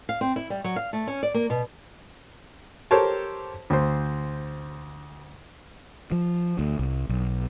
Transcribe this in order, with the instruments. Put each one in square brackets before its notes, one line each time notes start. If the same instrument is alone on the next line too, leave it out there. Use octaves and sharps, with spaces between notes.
[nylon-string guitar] F5
C4
E4
G3
F#3
F5
A3
C#4
D5
A#3
B2
[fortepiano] G4 A4 A#4 C5 C#5 A5
D2 C5
[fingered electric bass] F3
D2
C2
B1